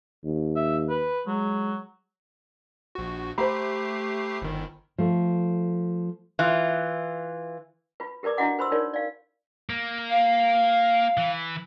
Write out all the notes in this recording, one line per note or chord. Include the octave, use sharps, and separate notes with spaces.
D#2
E5
B4
F#3 G#3
A#1 F#4
A3 G4 C5 A#5 B5 C7
G1 D#3
F3 A3
E3 F4
F4 B4
G4 A#4 B4 D5 D6
D4 E4 F#4 D#5 F#5 D6
B4 C5 B5 C6 E6
D#4 F4 A#4 C#5 D5
D5 F5
A#3
F5
E3